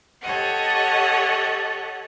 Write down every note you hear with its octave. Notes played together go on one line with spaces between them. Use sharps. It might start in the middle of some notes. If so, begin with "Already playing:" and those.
G4 A4 C#5 D#5 F#5